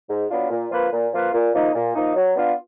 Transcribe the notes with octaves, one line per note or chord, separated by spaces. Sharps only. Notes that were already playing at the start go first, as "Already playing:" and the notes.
G#2
F#3 B3 D4 F4
A#2
F3 A#3 F4 B4
A#2
F3 A#3 F4 B4
A#2
F3 A#3 D#4
A#2
F3 A#3 D#4
F#3
B3 D4 F4